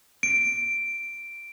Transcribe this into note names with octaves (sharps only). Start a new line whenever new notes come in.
D7